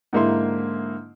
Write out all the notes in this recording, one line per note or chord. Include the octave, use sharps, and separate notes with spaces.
G#2 D3 A#3 E4 E5 C6